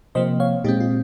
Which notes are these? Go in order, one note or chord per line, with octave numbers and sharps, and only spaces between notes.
C3 F3 A#3 C5 D#5
C#5 F5
A#2 G#3 C4 D#4 G4
F4